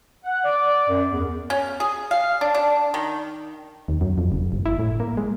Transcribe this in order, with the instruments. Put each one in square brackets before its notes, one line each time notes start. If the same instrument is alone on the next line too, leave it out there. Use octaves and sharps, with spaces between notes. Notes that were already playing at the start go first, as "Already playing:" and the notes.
[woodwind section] F#5
D5
F#2
E2
[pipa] C#4
G#4
F5
D4
D4
D#3
[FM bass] D#2
F#2
F2
F#1
G1
E4
A2
A#3
G#3